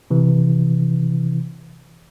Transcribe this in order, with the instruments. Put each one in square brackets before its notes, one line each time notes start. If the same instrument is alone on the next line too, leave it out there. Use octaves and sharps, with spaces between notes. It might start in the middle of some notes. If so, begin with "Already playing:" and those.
[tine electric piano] C3 E3